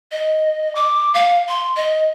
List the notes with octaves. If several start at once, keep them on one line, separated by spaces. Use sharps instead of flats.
D#5
D6
F5
C6
D#5